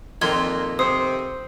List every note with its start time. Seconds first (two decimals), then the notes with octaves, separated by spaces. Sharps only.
0.22 F2 A#2 D#3 C6 G#6
0.79 C3 C5 D#6